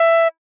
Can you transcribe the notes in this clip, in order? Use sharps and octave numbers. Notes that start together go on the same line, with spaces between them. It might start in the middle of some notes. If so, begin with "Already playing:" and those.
Already playing: E5